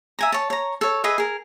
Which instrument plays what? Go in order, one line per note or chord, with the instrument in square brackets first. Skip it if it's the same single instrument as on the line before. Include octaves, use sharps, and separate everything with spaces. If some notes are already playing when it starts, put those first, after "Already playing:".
[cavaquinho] E5 G#5 A#5
C#5 A5
C#5 A#5
A4 C#5
G#4 B4 D#5 E5
G#4 A#4